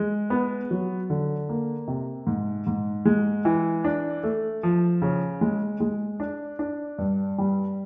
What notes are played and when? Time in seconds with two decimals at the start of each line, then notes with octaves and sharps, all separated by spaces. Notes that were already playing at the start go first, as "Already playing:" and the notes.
Already playing: G#3
0.30 B3
0.71 F#3
1.10 D3
1.49 A#3
1.88 C3
2.27 G#2
2.67 G#2
3.05 G#3
3.45 E3
3.84 D4
4.23 A3
4.63 F3
5.02 C#3
5.41 G#3
5.80 G#3
6.20 D4
6.59 D4
6.98 G2
7.38 G3